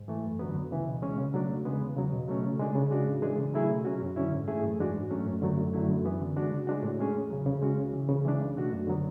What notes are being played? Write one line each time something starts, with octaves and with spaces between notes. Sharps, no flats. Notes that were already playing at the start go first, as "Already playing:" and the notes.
Already playing: G#2
E3 A3
F#2
D3 F#3 B3
D2
C#3 E3
B2
G#3 C#4
C#3
F#3 A3 D4
E2
C#3 G#3 B3
E2
C#3 F#3
B2
F#3 A3 C#4
C#3
G#3 D4 G#4
C#3
G#3 D4 F#4
A2
E3 G#3 D4 G#4
C#3
F#3 A3 E4 G#4
B2
F#3 C#4 F#4
F#2
D3 F#3 C#4 E4
G#2
E3 A3 E4 G#4
F#2
E3 G#3 D4 F#4
G#2
F#3 A3 C#4
F#2
D3 F#3 A3
F#2
D3 F#3 A3 E4
F#2
E3 B3
D3
G#3 D4 F#4
C#3
G#3 D4 F#4
A2
G#3 C#4 G#4
E2
C#3 F#3
C#3
G#3 C#4 F#4
C#2
C#3 E3
C#3
E3 G#3 D4
C#2
B2 A3 D4 F#4
F#2
D3 F#3 B3